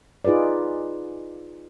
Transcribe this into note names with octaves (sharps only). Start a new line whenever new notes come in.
D#4 F4 G#4 B4 D5